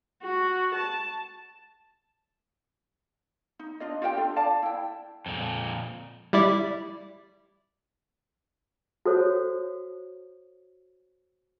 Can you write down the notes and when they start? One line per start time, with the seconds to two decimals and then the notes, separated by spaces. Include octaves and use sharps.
0.23 F#4
0.75 A5
3.59 D#4
3.80 D4 F4 D#5
4.02 F4 G4 E5 G5
4.17 D4 F4 A4
4.36 D5 F5 A5
4.63 E4 G5
5.26 F2 A#2
6.33 G3 E4 D5
9.06 F#4 A4 C5 C#5